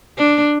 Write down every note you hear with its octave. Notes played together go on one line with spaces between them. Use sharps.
D4